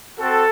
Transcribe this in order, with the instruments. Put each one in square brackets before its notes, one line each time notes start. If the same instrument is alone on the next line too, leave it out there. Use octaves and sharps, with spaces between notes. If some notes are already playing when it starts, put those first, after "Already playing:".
[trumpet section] C4 F#4 A4